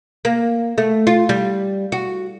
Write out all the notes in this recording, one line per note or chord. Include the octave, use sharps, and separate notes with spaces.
A#3
A3
F4
G3
F#4